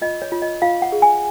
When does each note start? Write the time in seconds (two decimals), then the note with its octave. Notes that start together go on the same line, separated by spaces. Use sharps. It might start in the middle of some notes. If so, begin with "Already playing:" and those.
0.02 F4 D#5
0.22 C#5
0.32 F4
0.42 D#5
0.62 F4 F5
0.82 F#5
0.92 G#4
1.02 G#5